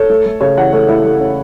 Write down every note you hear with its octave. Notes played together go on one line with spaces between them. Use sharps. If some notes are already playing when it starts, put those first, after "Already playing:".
Already playing: A4 C#5
A3
A3
C#3 A4 C#5
E3 C#5 F#5
A3 A4 C#5
A3 E4 A4
A3
C#4